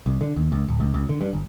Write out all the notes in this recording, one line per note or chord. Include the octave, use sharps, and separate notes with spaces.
C2
D3
D#2
C#2
D1
C#2
C#2
D3
G2
G1